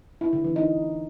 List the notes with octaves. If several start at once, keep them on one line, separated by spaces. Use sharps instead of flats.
E4
D3
E3
D#4